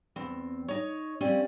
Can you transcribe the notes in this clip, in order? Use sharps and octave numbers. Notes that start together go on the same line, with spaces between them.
E2 C4
D#4 C#5
F3 G3 C4 C#4